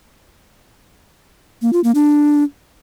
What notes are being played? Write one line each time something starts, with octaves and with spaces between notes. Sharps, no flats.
A#3
F4
A#3
D4